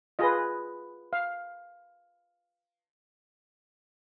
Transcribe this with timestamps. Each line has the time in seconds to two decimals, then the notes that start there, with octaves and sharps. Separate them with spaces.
0.19 F4 G#4 B4 D#5
1.13 F5